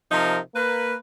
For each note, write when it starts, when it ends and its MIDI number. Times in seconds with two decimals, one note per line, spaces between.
0.12 0.38 48
0.12 0.38 53
0.12 0.38 63
0.12 0.38 70
0.55 0.94 58
0.55 0.94 71